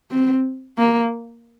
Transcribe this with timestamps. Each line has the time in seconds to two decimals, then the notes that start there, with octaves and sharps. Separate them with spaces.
0.11 C4
0.78 A#3